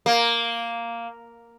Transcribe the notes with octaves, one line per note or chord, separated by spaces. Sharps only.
A#3